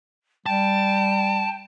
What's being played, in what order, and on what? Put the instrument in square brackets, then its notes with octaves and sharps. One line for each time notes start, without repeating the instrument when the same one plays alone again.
[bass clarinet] G3 [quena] G5 [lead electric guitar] A5